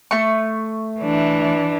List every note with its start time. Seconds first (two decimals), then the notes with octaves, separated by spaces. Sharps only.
0.11 A3 C#6
1.00 E3 D4